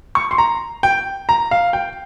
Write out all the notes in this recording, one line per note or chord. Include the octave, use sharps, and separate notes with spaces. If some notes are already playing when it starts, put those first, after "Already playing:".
C#6
C6
A#5
G5
A#5
F5
G5